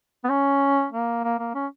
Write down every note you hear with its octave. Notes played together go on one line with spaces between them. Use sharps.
B3
C#4
A#3
A#3
A#3
C#4